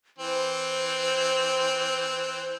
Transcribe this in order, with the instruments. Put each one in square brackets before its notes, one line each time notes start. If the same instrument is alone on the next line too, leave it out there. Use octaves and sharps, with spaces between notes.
[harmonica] E3 C4 [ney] C5